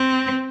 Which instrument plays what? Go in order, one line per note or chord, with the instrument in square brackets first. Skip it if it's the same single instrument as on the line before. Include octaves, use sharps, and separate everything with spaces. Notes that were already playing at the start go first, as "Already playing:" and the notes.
Already playing: [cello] C4